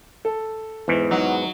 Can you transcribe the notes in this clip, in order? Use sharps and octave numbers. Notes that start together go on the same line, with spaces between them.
A4
E2 G#2 E3
F#3 D#4